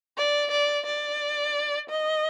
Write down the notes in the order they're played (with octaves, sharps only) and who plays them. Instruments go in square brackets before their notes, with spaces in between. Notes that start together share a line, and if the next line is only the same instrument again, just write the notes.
[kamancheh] D5
D5
D5
D#5